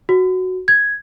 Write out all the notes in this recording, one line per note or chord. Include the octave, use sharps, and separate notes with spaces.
F#4
G#6